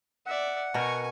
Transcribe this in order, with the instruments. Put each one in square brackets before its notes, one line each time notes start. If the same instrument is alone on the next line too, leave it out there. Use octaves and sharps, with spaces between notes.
[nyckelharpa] D5 E5 [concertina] F#5
[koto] B2 A#4 [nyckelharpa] G#5 C#6